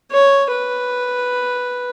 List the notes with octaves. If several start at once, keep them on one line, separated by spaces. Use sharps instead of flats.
C#5
B4